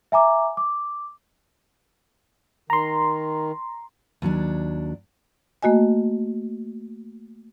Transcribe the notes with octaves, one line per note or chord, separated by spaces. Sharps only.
E5 G#5 A#5 D6
D6
D#3 A#5 C6
D#2 F#3 D4
A3 A#3 F#4 D#5 G#5